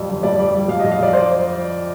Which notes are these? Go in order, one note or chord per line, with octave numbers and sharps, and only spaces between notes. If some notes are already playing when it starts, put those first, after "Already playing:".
Already playing: F2 G3
G1
F2 D5
G3
G3
F2 F5
F2 D#5
F5
F2 D5
C5